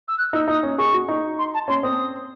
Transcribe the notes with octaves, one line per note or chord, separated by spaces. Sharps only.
E6
F#6
D#4 E6
D#4 D#6
C#4
G#4 C#6
F#4
D#4
C6
A5
C#4 C6
C4 D#6